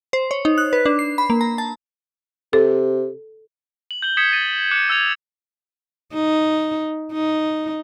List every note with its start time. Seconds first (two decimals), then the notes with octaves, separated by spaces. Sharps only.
0.13 C5
0.31 C#5
0.45 D#4
0.58 F#6
0.73 B4
0.86 D4
0.99 C7
1.18 B5
1.30 A#3
1.41 A#5
1.58 A5
2.53 C3 A4
3.91 F#7
4.02 G6 F#7 G7
4.17 D#6 G6 G#6 B6 C#7 E7
4.32 A6 D#7
4.71 D6 F#6 C#7 E7
4.89 D6 E6 F#6 G#6 F7
6.14 D#4
7.13 D#4